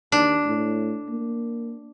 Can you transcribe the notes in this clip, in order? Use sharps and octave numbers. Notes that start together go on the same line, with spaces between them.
D#2 D4
A2
A#3